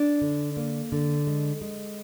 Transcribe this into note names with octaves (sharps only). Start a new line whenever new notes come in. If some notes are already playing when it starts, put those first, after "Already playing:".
Already playing: D4
D3
A#3
D3
G#3
G#3